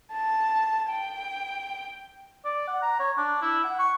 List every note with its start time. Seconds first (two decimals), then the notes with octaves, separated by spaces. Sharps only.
0.12 A5
0.91 G5
2.45 D5
2.68 F#5
2.83 A#5
3.00 C#5
3.17 D4
3.42 E4
3.64 F#5
3.79 C#6